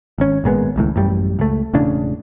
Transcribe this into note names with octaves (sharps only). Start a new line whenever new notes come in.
G#1 C#4
G#1 A#2 G#3 B3
D#1 C#2 A2
A1 F#2 G3
C#2 A3
E1 A2 C#3 D4